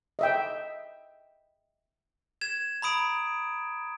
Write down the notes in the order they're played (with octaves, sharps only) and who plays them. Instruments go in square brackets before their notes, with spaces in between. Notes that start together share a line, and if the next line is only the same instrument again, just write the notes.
[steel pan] D#5 E5 G5
[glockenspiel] G#6 E7
A#5 B5 D#6 D7